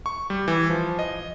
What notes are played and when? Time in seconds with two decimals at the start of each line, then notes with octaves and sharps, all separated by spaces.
0.06 C#6
0.30 G3
0.48 E3
0.70 F3
0.99 D#5